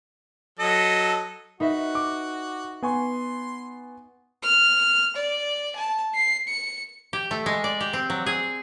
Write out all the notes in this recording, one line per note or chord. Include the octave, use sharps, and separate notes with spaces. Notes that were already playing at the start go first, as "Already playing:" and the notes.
F#3 A4 D#5
D#4 F#4 B4 E5
D6
B3 G#5 C6 C#6
F6
D5
A5
C7
C#7
G4
A3
G#3
D5
G4
C4
F#3
G#4